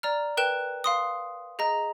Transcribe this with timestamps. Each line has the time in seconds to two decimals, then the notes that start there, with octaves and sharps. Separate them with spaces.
0.03 D5 A#5 F6
0.37 A#4 B4 G5 F#6 E7
0.84 F5 C6 D#6
1.59 G#4 D#5 A#5